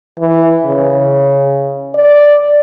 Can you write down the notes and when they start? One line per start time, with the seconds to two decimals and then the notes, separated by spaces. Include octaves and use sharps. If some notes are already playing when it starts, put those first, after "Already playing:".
0.19 E3
0.65 C#3
1.94 D5